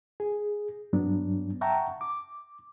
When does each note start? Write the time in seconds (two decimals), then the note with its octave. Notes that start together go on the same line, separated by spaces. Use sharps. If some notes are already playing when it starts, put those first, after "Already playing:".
0.20 G#4
0.93 G2 F#3 B3 D4
1.61 E5 F#5 G5 A5 A#5 C#6
2.01 D6